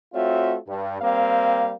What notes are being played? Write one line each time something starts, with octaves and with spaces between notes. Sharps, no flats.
A3 C4 F4 F#4 C#5 E5
G2
G3 A#3 C4 F5